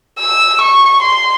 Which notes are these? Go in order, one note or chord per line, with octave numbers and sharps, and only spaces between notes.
E6
C#6
C6